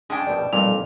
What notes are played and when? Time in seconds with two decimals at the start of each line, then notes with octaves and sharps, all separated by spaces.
0.10 G#3 C#4 D4 G5
0.27 A#1 B2 D5
0.53 B1 F2 A#2 G3 F7